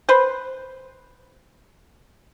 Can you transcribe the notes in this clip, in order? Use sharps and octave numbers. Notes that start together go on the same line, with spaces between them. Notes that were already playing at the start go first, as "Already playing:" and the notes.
B4 C5